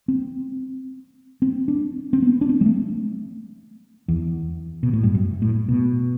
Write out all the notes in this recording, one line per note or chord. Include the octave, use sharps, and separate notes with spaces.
C4
C4
D4
C4
B3
D4
C4
G3
A3
E2
B2
A2
G2
F#2
A2
B2